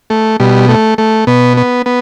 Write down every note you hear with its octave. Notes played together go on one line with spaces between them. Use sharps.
A3
B2 G3
A3
A3
B2 B3
B3
B3